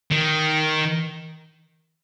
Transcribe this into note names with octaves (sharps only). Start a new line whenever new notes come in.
D#3